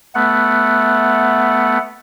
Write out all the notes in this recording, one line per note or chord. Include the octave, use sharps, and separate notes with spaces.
A3 B3 F#5